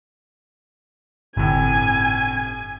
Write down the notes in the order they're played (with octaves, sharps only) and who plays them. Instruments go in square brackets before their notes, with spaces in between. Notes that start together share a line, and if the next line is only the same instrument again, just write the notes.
[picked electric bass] G1 [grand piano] A2 C3 [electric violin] G#5